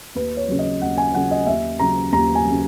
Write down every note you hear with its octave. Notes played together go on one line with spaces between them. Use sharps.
D#2 B4
C#5
C#3 F#3
D#5
D#2 F#5
G#5
C#3 F#3 F#5
D#5
D#2 E5
C#3 F#3 A#5
D#2 A#5
G#5
F#3
C#3